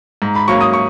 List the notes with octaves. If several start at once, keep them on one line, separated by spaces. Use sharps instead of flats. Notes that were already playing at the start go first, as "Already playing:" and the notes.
G#2 A#5
B5
F#3 A#3 C#4 C#6
D#6
C#6